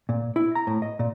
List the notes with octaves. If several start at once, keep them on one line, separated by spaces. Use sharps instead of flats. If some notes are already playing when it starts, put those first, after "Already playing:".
A#2
E4
A#5
A2
D#5
A#2